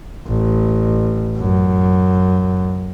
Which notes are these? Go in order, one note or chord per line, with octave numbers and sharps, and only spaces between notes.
A1
F#2